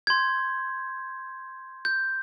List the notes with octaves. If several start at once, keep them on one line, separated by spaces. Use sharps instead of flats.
C6 G6 G#6
G6